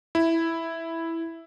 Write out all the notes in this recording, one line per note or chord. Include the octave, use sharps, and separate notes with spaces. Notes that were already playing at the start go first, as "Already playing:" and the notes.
E4